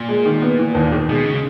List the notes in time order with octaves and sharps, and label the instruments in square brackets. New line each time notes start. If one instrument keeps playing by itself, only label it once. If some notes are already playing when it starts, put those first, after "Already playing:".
Already playing: [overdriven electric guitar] A#2
[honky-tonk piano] G#3
D#3
B3
E3
D#2
D#3
[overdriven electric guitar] B2 [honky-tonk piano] G#3
[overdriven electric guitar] C#3